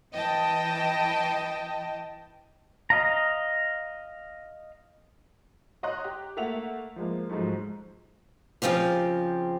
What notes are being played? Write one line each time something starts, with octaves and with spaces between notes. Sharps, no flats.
E3 D#5 G5 A5
D#5 F5 A#5
C#5 D#5 A#5 C6 F#6
G4
A3 A#3 E5 F#5 F7
F3 G#3 A#3
G#2 F3 F#3 G#3 A3
C#3 F3 C4 F4 G4